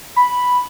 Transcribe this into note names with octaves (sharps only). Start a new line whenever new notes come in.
B5